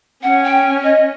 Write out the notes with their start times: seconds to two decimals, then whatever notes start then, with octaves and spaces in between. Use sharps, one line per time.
0.23 C#4 F#5
0.44 G5
0.84 D#5